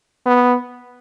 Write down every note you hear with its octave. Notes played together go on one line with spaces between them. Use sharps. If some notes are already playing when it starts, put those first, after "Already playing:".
B3